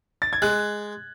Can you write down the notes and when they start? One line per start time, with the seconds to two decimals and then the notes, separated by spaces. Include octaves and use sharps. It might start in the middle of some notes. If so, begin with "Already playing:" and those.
0.22 A6
0.33 G#6
0.42 G#3 F#6